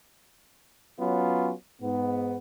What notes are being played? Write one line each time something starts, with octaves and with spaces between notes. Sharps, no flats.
F#3 B3 C#4 F4
G#2 B3